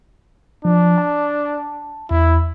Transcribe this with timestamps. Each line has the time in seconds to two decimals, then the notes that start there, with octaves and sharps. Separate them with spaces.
0.65 F3 D4
0.98 A5
2.11 E2 E4